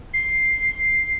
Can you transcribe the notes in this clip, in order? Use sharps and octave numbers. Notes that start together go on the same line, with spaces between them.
C7